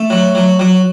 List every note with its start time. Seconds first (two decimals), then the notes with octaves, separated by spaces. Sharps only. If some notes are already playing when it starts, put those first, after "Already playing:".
Already playing: A3
0.10 F#3
0.35 F#3
0.59 F#3